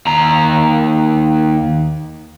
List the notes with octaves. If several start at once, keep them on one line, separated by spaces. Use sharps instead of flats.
D#2 A#5